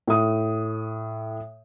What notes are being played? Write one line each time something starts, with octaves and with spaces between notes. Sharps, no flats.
A2 D#6